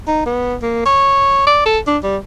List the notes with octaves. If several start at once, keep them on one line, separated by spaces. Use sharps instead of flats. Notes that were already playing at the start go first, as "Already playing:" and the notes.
D#4
B3
A#3
C#5
D5
A4
D4
G3